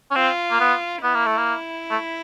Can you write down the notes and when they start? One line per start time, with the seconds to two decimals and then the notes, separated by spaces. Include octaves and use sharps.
0.11 C#4
0.16 C4 F4
0.52 A#3
0.60 B3
1.03 B3 E4
1.15 A#3
1.26 A3
1.37 A#3
1.91 A3